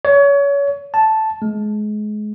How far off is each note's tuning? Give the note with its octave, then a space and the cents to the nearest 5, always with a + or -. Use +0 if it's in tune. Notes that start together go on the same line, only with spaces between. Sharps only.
C#5 +30
A5 -5
G#3 +30